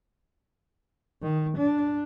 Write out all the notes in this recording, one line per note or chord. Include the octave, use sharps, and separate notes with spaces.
D#3
D4